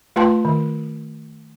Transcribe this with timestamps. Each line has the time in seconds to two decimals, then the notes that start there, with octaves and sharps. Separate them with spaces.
0.16 A3 F4 B4 G5 A5 C6
0.45 D#3